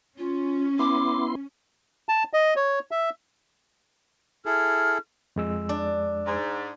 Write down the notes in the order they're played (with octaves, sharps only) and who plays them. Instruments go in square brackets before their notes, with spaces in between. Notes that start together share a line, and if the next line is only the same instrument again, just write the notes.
[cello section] C#4 [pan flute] F4
[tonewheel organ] B3 E4 C6 [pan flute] D6
[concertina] A5
D#5
C#5
E5
[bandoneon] E4 G#4 A4 [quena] F6
[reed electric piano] F2 G#3 E6
[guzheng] D4
[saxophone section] G#2